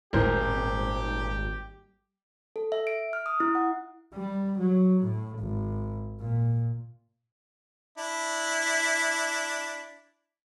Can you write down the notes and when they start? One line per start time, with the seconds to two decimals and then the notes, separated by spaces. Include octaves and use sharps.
0.13 D#1 G#1 D2 A2 G4 A#4 C5
2.56 A4
2.72 E5
2.87 D7
3.13 F6
3.26 D#6
3.40 E4
3.55 F#5
4.14 G3
4.60 F#3
5.04 A2
5.39 G#1
6.20 A#2
7.98 D4 E4